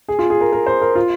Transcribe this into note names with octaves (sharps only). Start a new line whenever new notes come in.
G#4
F4
G#4
A#4
A#4
C5
A#4
F4